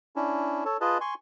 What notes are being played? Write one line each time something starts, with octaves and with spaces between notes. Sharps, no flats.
C#4 D4 E4
A4 C#5 A5
F4 G#4 B4 D#5 A5
G#5 C6 C#6